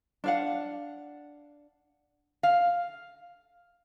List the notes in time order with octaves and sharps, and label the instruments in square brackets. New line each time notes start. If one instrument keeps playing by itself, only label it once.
[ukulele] D4 F5 F#5
[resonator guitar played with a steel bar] F5